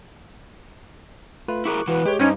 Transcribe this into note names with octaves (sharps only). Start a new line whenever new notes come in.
A3 F4 B4
E4 G#4 A#4 C#6 D6 F#6
E3 F#4 B4
G#3 G4 C#5
G2 C#4 D#4 C5 G5